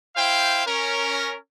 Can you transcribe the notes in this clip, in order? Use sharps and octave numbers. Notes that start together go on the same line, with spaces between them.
E4 C5 F5 G5
C#4 A#4